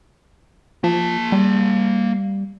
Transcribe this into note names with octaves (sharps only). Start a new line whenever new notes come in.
F3 A#3 A5
G3